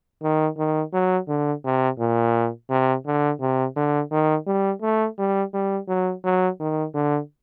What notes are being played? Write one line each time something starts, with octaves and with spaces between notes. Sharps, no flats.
D#3
D#3
F#3
D3
C3
A#2
C3
D3
C3
D3
D#3
G3
A3
G3
G3
F#3
F#3
D#3
D3